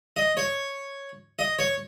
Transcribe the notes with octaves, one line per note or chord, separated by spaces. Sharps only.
D#5
C#5
D#5
C#5